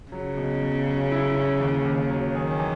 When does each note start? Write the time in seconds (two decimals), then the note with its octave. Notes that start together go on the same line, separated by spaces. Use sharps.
0.12 C#3 F#3
0.37 B2
0.62 F#3
0.86 F#3
1.11 E4
1.36 C#4
1.60 D#2
1.85 D#2
2.10 F#3
2.35 D#3 G#4
2.59 E3